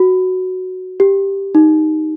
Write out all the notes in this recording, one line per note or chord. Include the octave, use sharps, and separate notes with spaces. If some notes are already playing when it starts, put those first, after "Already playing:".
Already playing: F#4
G4
D#4